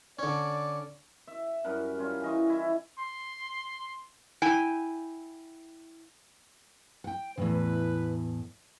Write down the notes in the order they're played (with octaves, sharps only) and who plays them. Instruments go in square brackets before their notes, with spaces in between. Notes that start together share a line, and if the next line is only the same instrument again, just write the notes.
[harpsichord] D3 C#4 [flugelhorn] D5
[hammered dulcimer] E5
F#2 G3 A#4 F#5
G3 C#4 F4
E3 D#5 C#6
E4 E5
[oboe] C6
[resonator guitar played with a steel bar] E4 G5 G#5
[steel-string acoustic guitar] F#5 G5
[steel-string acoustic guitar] E2 A2 C#3 [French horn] B4